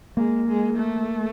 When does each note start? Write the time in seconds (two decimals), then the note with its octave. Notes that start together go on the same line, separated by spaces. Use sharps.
0.17 G#3 A#3
0.48 G#3
0.77 A3